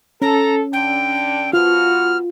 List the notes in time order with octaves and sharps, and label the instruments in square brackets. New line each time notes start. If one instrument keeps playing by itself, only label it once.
[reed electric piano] C#4 [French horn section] A4 [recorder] A#5
[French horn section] D3 D4 [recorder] G5
[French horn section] F3 B3 F#4 [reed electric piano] F4 [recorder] F6